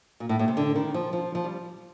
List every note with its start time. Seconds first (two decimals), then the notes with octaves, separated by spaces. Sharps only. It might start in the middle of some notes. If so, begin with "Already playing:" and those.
0.20 A#2
0.29 A2
0.39 A2
0.48 C3
0.57 D3
0.76 D#3
0.94 F3
1.13 F3
1.35 F3
1.44 G3